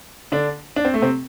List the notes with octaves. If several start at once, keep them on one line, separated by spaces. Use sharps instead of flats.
D3 D4
D4
C4
A3
C3 C4